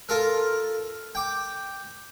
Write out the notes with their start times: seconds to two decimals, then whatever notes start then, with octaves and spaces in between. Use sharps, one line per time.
0.09 F4 A4 A#4
1.15 G5 D6